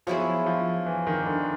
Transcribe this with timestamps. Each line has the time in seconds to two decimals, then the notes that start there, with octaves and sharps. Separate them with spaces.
0.07 F3 F#3 B3 E4 G#4
0.46 F3
0.86 E3
1.07 D#3
1.26 D3